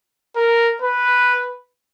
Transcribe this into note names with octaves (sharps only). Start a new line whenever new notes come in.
A#4
B4